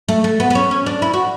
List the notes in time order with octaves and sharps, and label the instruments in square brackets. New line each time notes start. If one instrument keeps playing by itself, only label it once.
[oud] A3
A3
B3
B3
C#4
C#4
D4
E4
F#4